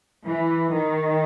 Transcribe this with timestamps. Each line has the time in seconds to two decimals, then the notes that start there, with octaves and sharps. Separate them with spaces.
0.24 E3
0.72 D#3